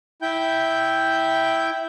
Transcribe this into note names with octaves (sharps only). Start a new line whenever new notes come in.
E4 G5 G6